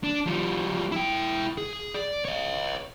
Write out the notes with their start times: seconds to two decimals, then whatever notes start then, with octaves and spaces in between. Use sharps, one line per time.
0.04 D4
0.26 F3 G3
0.92 E4 G5
1.57 G#4
1.94 D5
2.25 C#5 D#5